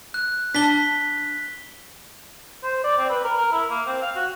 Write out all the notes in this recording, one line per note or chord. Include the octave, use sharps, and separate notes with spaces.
F#6
D4 A5 B6 G7
C5
D5
C4
B4
A#4
A#4
E4
A#3
C4
F5
F#4